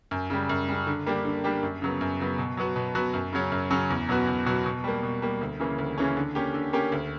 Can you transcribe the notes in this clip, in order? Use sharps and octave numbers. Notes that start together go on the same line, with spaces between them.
F#2
C#3 G3
F#2
C#3 G3
D3
G3 A#3 D4 G4
D3
G3 A#3 D4 G4
F#2
C#3 F#3 B3
F#2
C#3 F#3 B3
B2
F#3 B3 F#4
B2
F#3 B3 F#4
F#2
C#3 F#3 C#4
F#2
C#3 F#3 C#4
E2
B2 F#3 B3 F#4
E2
B2 F#3 B3 F#4
B2
G3 A#3
B2
G3 A#3
D2
C#3 E3 A#3 C#4
D2
C#3 E3 A#3 C#4
D3
A#3 C#4 G4
D3
A#3 C#4 G4
D2